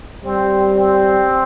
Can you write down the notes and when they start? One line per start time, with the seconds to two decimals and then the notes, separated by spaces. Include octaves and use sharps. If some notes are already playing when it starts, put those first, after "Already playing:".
0.23 G3 C4
0.75 C4